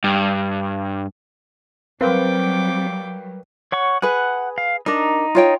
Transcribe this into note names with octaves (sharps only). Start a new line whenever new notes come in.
G2
F#3 G3 C4 A#4 B4 F5 G5 D6
C#5 F#5 C#6
G#4 B4 F#5
F5
D4 D#4 A#4
F4 C#5 G5